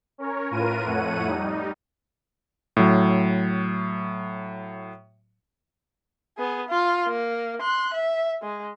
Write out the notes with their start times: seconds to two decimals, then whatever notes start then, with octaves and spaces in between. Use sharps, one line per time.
0.18 C#4 A#4 C#5
0.51 A2 F4 A#4 B4 D#7
0.85 F2 A2 A3 C#5 F#5 D#7
1.26 G3 D#4
2.77 A2 F#3
6.37 B3 G#4
6.69 F4
7.07 A#3
7.61 C6 F#6
7.94 E5
8.42 G#3